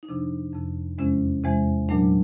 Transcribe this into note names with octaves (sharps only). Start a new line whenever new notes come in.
D#4
F2 C3 F3 D4
F2 C3 F3
E2 C3 E3 G#3 C#4
E2 C3 E3 G#3
A#2 F#3 A3 D4